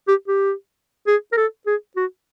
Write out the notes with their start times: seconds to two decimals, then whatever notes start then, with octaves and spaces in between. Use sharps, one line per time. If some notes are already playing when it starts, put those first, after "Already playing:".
0.08 G4
0.28 G4
1.07 G#4
1.32 A#4
1.37 A4
1.66 G#4
1.96 F#4